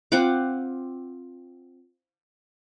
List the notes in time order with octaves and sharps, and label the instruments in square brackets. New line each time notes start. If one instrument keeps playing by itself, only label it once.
[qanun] C4 F4 F#5 D6